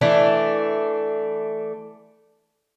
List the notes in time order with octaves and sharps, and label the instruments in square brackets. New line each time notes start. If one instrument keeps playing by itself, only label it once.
[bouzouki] E3 A3 D4